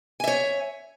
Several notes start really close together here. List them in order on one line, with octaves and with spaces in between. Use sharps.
G#5 E5 C#5